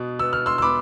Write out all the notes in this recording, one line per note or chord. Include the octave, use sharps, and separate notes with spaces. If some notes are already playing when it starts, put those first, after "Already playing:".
Already playing: B2 B3
B3 E6
F6
C6 E6
E6
B3 B5 D6